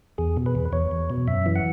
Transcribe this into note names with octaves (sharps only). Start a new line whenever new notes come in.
E2 G#4
B2
B4
E2
E2 C#5
E2
B2
F#2 E5
E3
F#5